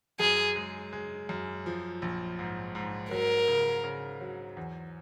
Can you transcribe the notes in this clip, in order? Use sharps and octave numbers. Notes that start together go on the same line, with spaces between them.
F#2 G#4
G#3
G#3
F#2
F3
A#1
G#2
G#2
F#3 A#4
C#3
C#3
F#3
E2